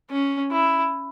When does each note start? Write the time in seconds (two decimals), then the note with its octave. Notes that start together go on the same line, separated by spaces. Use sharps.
0.10 C#4
0.51 E4